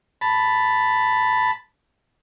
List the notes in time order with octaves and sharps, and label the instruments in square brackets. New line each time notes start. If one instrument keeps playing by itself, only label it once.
[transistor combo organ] A5 B5